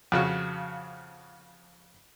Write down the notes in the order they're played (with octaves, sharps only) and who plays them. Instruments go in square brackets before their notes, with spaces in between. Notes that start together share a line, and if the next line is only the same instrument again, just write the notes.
[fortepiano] F2 C#3 F#4